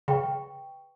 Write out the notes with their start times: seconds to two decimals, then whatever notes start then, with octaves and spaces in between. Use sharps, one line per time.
0.08 C#3 B4 G5 C#6